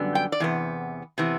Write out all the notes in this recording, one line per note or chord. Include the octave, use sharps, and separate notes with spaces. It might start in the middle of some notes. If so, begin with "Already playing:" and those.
Already playing: F#2 D3 G3 B3
G5
D5
E2 C3 B3
C3 E3 B3